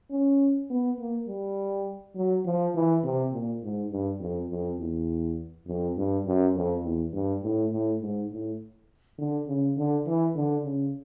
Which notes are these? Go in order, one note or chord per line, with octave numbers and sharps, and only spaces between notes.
C#4
B3
A#3
G3
F#3
F3
E3
C3
A#2
G#2
G2
F2
F2
E2
F2
G2
F#2
F2
E2
G2
A2
A2
G#2
A2
D3
C#3
D3
E3
D3
C#3